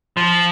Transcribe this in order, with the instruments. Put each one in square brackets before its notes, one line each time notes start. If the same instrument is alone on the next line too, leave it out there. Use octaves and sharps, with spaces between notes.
[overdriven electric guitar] F3